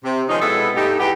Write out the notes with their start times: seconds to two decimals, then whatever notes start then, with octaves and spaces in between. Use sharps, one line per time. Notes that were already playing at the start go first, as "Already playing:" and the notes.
0.03 C3
0.28 D#3 F3 G#3 C#4 D#4
0.41 B2 G#3 B3 E4 G#4 A4
0.75 G2 A3 B3 D#4 G4
0.99 E2 B3 G4